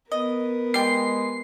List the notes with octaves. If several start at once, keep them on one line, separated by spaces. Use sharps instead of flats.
B3 A#4 D#5
G3 G#3 G5 C7